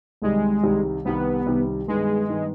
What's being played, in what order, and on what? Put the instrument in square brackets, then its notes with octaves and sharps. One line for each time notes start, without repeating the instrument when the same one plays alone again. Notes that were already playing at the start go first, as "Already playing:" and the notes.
[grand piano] C2 C3 D#3 G3 [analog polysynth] G#3
[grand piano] C2 C3 D#3 G3
[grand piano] C2 C3 D#3 G3 [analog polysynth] B3
[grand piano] C2 C3 D#3 G3
[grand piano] G2 D#3 B3 [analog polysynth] G#3
[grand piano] G2 D#3 B3